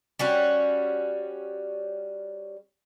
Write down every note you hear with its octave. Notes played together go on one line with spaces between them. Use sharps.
G3 C#4 F#4